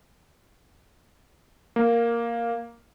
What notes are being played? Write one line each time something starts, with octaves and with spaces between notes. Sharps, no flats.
A#3